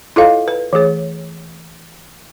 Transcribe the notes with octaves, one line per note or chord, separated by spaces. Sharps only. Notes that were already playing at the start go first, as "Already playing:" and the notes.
E4 F4 A4 C#5 D#5 F5
B4
E3 A3 G#4 C#5